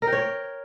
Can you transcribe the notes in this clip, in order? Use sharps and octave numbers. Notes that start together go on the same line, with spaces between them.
A#4
G5
C#5